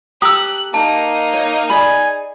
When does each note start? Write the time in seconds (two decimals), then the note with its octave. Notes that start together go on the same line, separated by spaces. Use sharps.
0.22 G4 A4 A#5 D#6 E6 F#6
0.74 A#3 D#4 A5
1.33 C#5
1.70 G#4 D5 G#5 B5